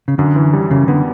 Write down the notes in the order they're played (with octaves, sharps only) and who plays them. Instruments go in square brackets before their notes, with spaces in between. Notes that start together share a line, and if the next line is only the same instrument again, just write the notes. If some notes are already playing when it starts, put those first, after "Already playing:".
[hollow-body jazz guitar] C#3
[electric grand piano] F#2 [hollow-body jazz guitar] D3
[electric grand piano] E3
G3
[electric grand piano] F#2 [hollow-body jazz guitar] C#3
[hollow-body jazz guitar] D3 [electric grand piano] B3